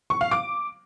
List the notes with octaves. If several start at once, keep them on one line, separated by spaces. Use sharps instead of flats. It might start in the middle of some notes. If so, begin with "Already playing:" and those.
C#6
F5
D6